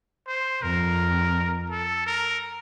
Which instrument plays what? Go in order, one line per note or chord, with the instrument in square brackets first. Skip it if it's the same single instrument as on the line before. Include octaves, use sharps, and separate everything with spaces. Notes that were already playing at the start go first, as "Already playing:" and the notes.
[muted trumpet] C5
[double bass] F2 [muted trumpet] A#4
[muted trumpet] A4
A#4